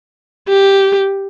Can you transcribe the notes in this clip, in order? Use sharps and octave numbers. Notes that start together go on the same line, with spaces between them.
G4